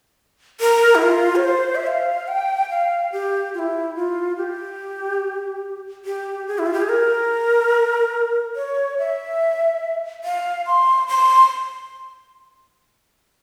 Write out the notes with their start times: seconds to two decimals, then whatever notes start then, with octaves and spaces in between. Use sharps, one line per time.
0.61 A#4
0.95 E4
1.02 F4
1.36 C#5
1.44 C5
1.75 E5
1.87 F5
2.28 G5
2.70 F5
3.12 G4
3.54 F4
3.59 E4
3.96 F4
4.37 G4
6.05 G4
6.48 G#4
6.59 E4
6.66 F4
6.73 G4
6.82 G#4
6.89 A#4
8.56 C#5
8.99 E5
10.24 F5
10.66 C6
11.08 C6